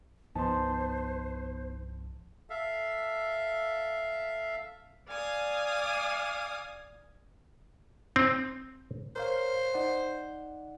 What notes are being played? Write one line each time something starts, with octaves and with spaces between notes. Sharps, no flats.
C2 G2 F3 B3 D#4 C5 A5 C6
A4 E5 F5
D5 F5 G#5 D#6
C4
A#4 C5 C#5 F5
D#4 D5 F#5